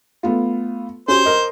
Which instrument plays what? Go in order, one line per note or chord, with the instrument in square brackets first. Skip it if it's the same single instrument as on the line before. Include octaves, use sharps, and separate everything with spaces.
[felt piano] A3 B3 F4
[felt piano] C#4 F#4 G4 [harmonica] C5
[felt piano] A#4 D#5